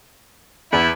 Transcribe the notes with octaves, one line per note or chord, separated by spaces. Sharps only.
E2 E4